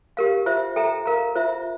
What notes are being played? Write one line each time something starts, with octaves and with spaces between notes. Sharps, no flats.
G4 A#4 F5
F4 C5 E5
A4 E5 G5 A#5
A#4 F5 A#5
F4 C5 E5